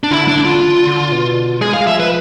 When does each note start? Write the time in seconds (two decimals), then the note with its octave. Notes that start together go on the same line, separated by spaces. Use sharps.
0.03 D4
0.11 D3 E4
0.28 D4
0.36 D3
0.45 F4
0.87 D3
1.12 B2
1.61 G#3 G#4
1.74 F5
1.81 G#3
1.86 F3 E5
2.00 B4